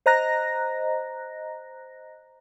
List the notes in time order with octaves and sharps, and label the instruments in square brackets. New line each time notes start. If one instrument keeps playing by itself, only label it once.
[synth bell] C5 D#5 A#5 F#6 A#6